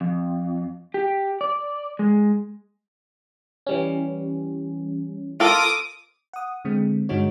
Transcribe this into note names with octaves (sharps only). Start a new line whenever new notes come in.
F2
G4
D5
G#3
E3 G3 C#4
F4 A4 A#4 D6 D#6
F#5 D#6
D3 G#3 C4
G2 D3 G#3 D#4 F#4 C#5